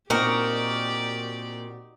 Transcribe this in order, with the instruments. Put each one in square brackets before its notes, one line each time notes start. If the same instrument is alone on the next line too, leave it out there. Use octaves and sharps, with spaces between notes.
[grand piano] A#2 C4 [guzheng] D#4 [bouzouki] F#4 A#4 [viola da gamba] G4 D5